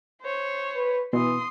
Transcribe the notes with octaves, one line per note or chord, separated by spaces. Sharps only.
C5 C#5
B4
B2 E3 C6 D#6